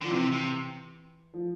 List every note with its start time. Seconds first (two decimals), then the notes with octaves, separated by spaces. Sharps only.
0.01 D3 F3
0.11 C3 E3
0.32 C3
1.34 F3